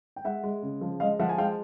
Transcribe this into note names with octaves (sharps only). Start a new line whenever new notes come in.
G5
G#3 E5 F#5
G#3
C#3
F3
G#3 D#5 F5
F3 E5 F#5
G#5
G#3 F5 G5